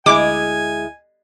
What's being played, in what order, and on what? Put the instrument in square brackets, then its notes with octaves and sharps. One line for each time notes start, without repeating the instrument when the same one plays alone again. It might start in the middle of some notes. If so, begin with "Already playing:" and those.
[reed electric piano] D2 E4 E5 [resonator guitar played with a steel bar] G#3 [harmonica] G#5 [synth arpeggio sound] D6